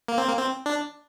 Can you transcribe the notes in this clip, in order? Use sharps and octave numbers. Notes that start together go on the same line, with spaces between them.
A#3
C4
A#3
C4
D4